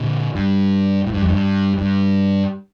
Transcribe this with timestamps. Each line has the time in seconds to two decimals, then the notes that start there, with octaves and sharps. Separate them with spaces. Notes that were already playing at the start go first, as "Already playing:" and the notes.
Already playing: A#2 D3
0.35 G2
1.06 A2
1.13 G2
1.22 F2
1.29 G2
1.78 G2